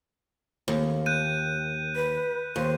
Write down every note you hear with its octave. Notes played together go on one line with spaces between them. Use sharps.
D#2
F#6 G6 D#7
B4
D#2 C5